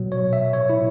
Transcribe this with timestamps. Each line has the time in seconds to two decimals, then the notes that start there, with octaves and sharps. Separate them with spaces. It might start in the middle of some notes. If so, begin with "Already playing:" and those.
Already playing: B2 F#3
0.12 C#5
0.33 E5
0.53 C#5
0.70 E4